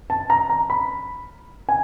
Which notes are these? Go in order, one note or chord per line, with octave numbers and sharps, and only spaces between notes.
A5
A#5
A#5
B5
G#5